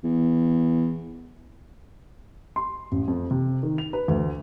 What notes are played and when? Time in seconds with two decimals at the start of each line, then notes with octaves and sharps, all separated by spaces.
0.03 E2
2.56 C6
2.92 A1
3.08 F2
3.31 C3
3.63 D#3
3.78 F7
3.93 B4
4.08 D2